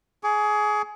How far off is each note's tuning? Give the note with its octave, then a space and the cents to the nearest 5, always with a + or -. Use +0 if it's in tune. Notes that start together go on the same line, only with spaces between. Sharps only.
G#4 +20 D6 -45